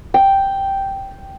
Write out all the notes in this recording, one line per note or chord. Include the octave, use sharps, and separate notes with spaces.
G5